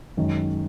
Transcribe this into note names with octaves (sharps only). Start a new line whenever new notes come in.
F#2 D#3 G#3